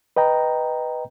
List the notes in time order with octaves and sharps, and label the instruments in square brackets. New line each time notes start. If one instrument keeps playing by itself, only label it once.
[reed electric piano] B4 D#5 G5 A#5